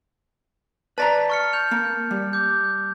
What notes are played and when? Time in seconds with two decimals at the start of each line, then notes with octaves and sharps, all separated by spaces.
0.98 B4 D5 A5 A#5 A6 B6
1.30 C#6 F6 C#7
1.53 G6 F7
1.71 A#3
2.11 G3
2.33 D6 G6